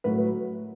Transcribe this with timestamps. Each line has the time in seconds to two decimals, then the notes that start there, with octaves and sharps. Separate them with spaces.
0.04 A2 F#3 B4